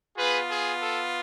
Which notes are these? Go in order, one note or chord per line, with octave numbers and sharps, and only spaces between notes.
B3 F4 G#4 B4
G#4
A4